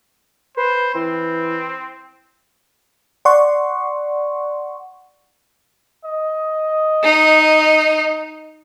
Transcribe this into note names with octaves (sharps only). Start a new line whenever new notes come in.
B4 C5
E3 C4
D5 F#5 C6 C#6
D#5
D#4